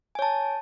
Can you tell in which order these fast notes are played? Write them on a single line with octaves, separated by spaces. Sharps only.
G#5 C#5 A5